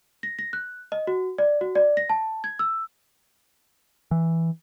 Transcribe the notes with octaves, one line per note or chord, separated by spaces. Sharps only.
A#6
A#6
F#6
D#5
F#4
D5
F#4
D5
A#6
A5
G#6
E6
E3